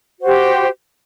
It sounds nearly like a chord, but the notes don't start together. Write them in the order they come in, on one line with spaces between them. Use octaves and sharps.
F#4 C5 G4